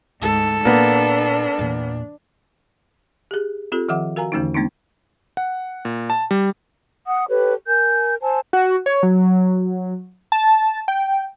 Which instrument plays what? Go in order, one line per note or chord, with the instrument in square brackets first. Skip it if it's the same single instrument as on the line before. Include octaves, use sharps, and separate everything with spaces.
[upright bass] D2 [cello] G#2 [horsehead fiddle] A4
[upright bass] A#2 [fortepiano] A#3 B3 [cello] D4
[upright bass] E2 A#2
[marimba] G4 G#4
C4 F4 G4 A4
D#3 F3 E5 F#5 D6
F#4 A#4 F5 G#5 A#5
E2 D3 E3 A3 C#4 D#4
G#3 A3 B3 C4 D4 D#4
[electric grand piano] F#5
A#2
A5
G3
[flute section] F#5 D#6
G4 A4 B4 C#5
A#4 G#5 G6
C5 G#5 A5 E6
[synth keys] F#4
C#5
F#3
A5
G5